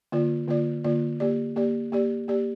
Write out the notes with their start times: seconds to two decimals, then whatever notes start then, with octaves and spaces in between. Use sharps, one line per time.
0.12 D3 A#3 F4 D5
0.48 D3 A#3 F4 D5
0.84 D3 A#3 F4 D5
1.20 A#3 G4 D5
1.56 A#3 G4 D5
1.92 A#3 G4 D5
2.28 A#3 G4 D5